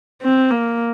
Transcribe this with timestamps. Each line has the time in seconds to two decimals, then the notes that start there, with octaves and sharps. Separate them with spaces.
0.22 C4
0.50 A#3